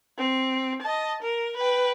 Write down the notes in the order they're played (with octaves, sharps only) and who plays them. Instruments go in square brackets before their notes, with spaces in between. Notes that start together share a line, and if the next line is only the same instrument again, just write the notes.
[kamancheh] C4
D#5 A5
A#4
B4 G5